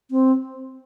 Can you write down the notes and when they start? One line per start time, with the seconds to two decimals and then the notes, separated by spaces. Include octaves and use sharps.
0.11 C4